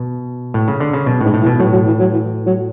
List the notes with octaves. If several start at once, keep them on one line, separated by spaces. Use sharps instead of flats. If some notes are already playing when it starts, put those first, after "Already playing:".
Already playing: B2
A2
C#3
D3
C#3
F#2 B2
A2
G#2
A2
E3
B2
A2 F#3
F#3
E3
F#3
E3
F#3